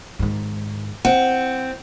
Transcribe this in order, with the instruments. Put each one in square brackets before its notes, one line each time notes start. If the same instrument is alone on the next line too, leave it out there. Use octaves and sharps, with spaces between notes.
[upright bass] G#2 D#3
[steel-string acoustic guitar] C4 [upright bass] E4 [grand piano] F#5